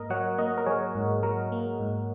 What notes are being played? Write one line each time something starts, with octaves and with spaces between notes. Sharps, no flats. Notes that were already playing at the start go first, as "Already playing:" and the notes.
Already playing: G#2 A#3 A#4 D#5
F#3 C#5 F#5
A#3 A#4 D#5
A#4
F#3 G#4 C#5
G#2
F#3 A#4
A#3
G#2